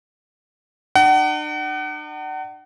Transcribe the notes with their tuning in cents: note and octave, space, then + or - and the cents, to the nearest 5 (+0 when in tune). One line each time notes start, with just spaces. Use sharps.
D4 +45 F#5 +35